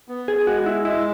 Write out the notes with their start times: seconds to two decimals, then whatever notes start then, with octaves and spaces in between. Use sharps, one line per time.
0.08 B3
0.28 G#4
0.47 G#3 F#4
0.66 E4
0.85 G#3 E4